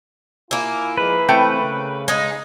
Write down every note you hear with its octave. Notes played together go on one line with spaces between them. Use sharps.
A#3 E4 F4 G#5
F3 G#3 B4
E3 A3 C4 G5
C#3
G#3 D#4